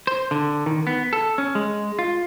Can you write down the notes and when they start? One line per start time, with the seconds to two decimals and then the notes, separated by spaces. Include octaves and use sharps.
0.07 C5
0.31 D3
0.66 D#3
0.87 B3
1.13 A4
1.38 C#4
1.55 G#3
1.99 F4